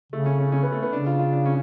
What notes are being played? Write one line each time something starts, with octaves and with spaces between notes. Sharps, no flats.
C#3 A3
C#4
C#4
C#4
B3
A3
B3
C#3 D4
F4
F4
D4
C#4